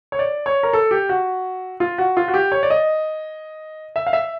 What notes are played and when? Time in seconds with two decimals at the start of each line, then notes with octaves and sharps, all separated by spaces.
0.12 C#5
0.19 D5
0.46 C#5
0.63 A#4
0.73 A4
0.91 G4
1.09 F#4
1.80 F4
1.98 F#4
2.17 F4
2.28 F#4
2.34 G4
2.52 C#5
2.63 D5
2.70 D#5
3.96 E5
4.06 F5
4.13 E5